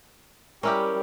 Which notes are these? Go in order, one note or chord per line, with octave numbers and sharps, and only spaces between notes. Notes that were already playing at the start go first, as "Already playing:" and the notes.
G3 C#4 E4 G4 A#4